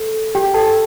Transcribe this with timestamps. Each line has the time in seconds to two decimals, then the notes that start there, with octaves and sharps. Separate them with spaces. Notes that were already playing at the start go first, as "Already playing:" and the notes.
Already playing: A4
0.35 G4 G5
0.54 A4 A5